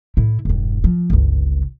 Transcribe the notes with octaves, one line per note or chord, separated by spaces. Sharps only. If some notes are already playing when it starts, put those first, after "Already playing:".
A2 E4
E1 G2
F3
G1 C#2